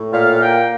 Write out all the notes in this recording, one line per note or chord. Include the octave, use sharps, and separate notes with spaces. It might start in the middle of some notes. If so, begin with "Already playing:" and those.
Already playing: A2
A#2 F5
A#3 G5